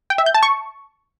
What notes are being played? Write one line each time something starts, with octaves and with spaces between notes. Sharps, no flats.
G5
E5
G6
A5
C#6